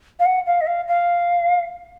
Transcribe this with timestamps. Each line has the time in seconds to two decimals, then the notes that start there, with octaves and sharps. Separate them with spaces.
0.19 F5
0.25 F#5
0.47 F5
0.61 D#5
0.67 F5
0.88 F5